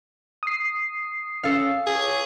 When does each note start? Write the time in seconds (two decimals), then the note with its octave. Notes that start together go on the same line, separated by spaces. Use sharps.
0.43 D#6 C7
1.43 C#4 A4 F5
1.87 G#4 C#5